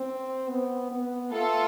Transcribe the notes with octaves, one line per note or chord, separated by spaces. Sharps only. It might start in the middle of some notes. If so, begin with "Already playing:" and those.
Already playing: C4
B3
B3
A3 F4 A4